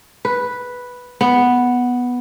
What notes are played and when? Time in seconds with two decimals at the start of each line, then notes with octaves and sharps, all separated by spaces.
0.25 B4
1.21 B3